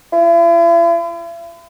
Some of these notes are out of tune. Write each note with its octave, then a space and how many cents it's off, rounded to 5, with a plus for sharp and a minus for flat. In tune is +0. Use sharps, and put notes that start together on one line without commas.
E4 +45